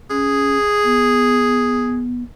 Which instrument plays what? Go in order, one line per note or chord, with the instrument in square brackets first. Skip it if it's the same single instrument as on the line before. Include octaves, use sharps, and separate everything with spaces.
[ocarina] C#4 [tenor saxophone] G#4
[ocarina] B3